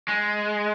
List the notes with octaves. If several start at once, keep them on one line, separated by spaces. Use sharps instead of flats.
G#3